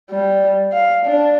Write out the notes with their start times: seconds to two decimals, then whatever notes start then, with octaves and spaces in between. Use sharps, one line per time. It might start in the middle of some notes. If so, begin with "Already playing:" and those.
0.11 G3
0.73 F5
1.06 D4